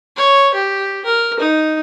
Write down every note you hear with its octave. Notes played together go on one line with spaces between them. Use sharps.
C#5
G4
A#4
D#4